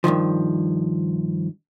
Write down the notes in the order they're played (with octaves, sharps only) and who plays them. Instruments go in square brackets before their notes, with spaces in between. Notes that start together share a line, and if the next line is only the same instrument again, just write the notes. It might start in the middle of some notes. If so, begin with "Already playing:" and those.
[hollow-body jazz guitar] G2 A#2 D#3 F3